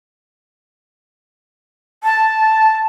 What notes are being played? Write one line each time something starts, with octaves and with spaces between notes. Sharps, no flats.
A5